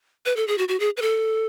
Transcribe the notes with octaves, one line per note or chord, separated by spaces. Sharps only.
B4
A4
G#4
F#4
F#4
G#4
B4
A4